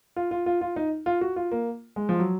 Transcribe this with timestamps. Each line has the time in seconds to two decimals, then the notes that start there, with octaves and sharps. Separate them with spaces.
0.16 F4
0.31 F4
0.46 F4
0.61 F4
0.76 D#4
1.06 F4
1.21 F#4
1.36 F4
1.51 A#3
1.96 G#3
2.09 F3
2.19 F#3